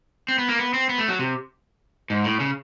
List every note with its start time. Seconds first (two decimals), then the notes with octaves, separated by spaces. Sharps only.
0.28 C4
0.38 B3
0.49 A#3
0.58 B3
0.74 C4
0.89 B3
0.98 A3
1.08 F#3
1.19 C3
2.10 G#2
2.24 A2
2.40 C#3